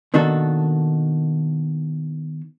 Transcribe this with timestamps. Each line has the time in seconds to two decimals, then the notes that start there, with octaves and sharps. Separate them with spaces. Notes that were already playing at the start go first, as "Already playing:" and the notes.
0.14 B2 D#3 A#3 D4 F#4 A4